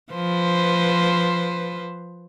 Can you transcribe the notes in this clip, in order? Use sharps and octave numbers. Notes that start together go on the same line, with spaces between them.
F3 B4 C5